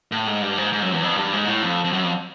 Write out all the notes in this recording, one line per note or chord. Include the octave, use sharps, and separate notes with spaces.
A2
G#2
G2
G#2
G#2
F#2
E2
F2
G2
G#2
A2
F2
F2
F#2
F2